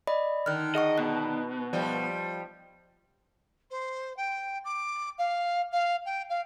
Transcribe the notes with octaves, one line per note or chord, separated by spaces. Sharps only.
D5 D#5 B5
D3 D#3 F6 F#6
G#4 D#5 F#5 C#6
B2 F#6
F3 G3 D#5
C5
G5
D6
F5
F5
G5
F5